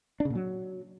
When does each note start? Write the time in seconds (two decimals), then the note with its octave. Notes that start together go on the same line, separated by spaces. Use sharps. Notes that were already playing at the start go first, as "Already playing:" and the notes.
0.20 D4
0.25 C#3
0.30 A#2
0.35 F#3